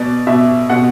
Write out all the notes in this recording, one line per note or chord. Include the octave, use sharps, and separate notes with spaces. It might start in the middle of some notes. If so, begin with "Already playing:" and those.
Already playing: B2 D5
B2 E5
B2 F#5